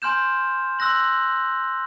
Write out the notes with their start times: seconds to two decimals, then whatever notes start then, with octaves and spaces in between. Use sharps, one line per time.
0.02 G#5 C6 F6 G6 E7
0.79 C6 E6 F#6 A#6 F#7